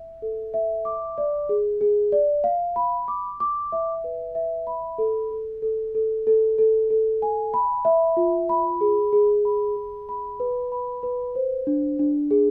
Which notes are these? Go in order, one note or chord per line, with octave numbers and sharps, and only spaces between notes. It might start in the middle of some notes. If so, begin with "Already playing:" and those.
Already playing: E5
A4
E5
D6
D5
G#4
G#4
D5
F5
B5
D6
D6
E5
B4
E5
B5
A4
A4
A4
A4
A4
A4
A4
G#5
B5
E5
F4
B5
G#4
G#4
B5
G#4
B5
B4
B5
B4
C5
D4
D4
G#4